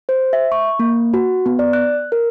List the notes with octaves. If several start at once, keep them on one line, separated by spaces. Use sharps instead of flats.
C5
E5
C#6
A#3
F#4
B3
D5
F#6
A#4